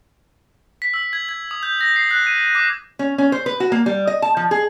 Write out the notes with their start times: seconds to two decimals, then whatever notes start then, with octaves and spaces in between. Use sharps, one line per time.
0.82 B6
0.94 E6
1.13 G#6
1.29 G#6
1.51 D#6
1.63 G6
1.81 A#6
1.96 C7
2.11 F#6
2.27 D#7
2.55 D6
2.99 C#4
3.18 C#4
3.32 C5
3.46 B4
3.60 F#4
3.72 A#3
3.86 G3
4.07 D#5
4.22 A5
4.37 F3
4.51 G#4